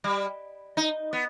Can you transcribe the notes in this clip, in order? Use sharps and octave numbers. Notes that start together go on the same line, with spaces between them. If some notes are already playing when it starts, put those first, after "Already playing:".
G3
D#4
B3